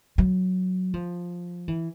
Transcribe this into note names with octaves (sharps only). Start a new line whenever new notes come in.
F#3
F3
E3